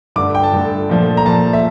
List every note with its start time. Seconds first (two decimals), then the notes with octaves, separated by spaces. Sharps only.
0.16 G2 D3 A3 D6
0.35 G5
0.43 A5
0.53 G2 D3 A3
0.89 A#2 F3 A3
1.17 A#5
1.25 A#2 F3 A3 A5
1.53 E5